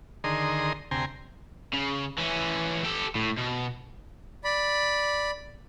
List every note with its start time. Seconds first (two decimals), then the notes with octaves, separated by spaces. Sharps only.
0.24 D3 D#3 G#4 A#5 C6 D#6
0.91 D2 C3 G5 G#5 A#5 C6
1.73 C#3
2.18 E3 C#4
2.84 G4 A4
3.15 A2
3.37 B2
4.44 D5 B5